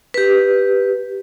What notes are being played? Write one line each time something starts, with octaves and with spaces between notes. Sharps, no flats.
G4 B4